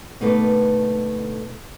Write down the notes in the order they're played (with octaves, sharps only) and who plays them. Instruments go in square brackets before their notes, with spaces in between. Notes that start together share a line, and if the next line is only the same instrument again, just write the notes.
[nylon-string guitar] B2 D3 A3 A#3 D#4 B4